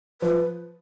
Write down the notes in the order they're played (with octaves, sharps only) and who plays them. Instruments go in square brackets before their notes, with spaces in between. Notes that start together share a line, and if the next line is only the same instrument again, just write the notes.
[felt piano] F3 [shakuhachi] B4